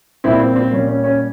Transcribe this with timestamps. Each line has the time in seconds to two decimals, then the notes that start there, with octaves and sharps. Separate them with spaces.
0.24 A#2 G3 C4 E4
0.40 C4
0.56 C4
0.71 A#2 G3 C#4
0.88 C#4
1.04 C#4